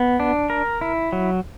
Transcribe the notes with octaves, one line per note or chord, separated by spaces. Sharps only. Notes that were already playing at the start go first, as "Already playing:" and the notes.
Already playing: B3
D4
A#4
E4
F#3